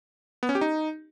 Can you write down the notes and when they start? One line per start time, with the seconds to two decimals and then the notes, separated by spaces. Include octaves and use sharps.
0.43 B3
0.49 C#4
0.55 G4
0.61 D#4